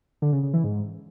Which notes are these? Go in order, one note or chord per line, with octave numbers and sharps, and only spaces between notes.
D3
C#3
C#3
E3
G#2